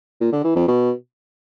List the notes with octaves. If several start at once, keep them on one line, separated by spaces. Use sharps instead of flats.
A#2
D3
E3
F2
B2